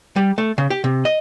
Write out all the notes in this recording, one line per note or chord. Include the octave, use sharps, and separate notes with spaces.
G3
A3
C#3
G4
C3
D#5